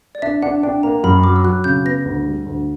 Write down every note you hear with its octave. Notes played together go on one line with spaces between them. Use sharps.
D5
D4 E5
D4 F#5
D4 G5
A#3 A#5
F#2 B5
F#3 D6
E6
F#3 F#6
C#3 G6
B3 A#6
D2
G3
D2